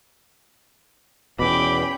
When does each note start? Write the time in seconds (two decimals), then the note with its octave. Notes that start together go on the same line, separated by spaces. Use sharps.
1.39 E2 B2 C#4 G5 B5 D6